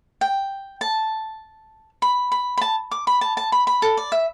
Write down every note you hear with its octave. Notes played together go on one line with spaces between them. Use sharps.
G5
A5
B5
B5
B5
A5
D6
B5
A5
A5
B5
B5
A4
D5
E5